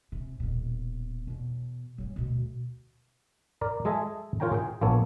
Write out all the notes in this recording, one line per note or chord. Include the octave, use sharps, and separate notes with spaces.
C#2 C3
D#1 B2
E2 B2
F#3 G#3
D2 B2
A#4 D5 A#5
G#3 G#4 A4 D#5 E5 G#5
F4 A#4 C#5 G5 G#5 A#5
G#4 G5
A#1 A#3 B3 A4 C#5